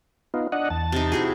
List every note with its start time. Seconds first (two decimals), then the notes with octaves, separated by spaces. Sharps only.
0.34 B3 D#4 F4
0.52 D4 D#5 F#5
0.70 E2 A5
0.92 C3 D#4
1.12 E4 F#4 G#4